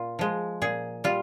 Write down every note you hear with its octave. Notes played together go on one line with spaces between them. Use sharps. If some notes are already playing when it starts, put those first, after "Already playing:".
Already playing: A#2 F4
F3 G#3
A#2 G#4
G3 F4